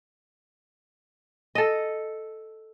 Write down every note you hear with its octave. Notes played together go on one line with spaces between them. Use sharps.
A4 D#5